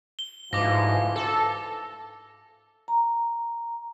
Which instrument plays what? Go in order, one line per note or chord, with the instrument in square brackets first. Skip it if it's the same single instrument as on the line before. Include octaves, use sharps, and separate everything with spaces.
[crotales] G7
[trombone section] D2 E3 F3 [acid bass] G#2 [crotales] D6 A#6
[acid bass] A4
[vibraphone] A#5